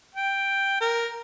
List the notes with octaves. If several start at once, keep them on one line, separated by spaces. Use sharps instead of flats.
G5
A#4